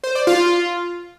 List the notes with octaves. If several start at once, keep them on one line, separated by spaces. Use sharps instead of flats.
C5
D5
F4